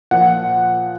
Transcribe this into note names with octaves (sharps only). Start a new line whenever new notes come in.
A#2 F3 F#5